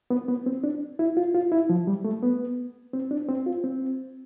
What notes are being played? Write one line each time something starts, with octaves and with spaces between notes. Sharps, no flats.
B3
B3
C4
D4
E4
F4
F4
E4
F3
G3
A3
B3
C4
D4
C4
F4
C4